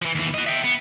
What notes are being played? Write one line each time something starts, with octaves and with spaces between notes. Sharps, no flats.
E3 F3
D#2 E3
F#4 D#5
E5 G5
B3